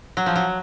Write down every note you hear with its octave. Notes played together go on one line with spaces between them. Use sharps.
F#3
F3
F#3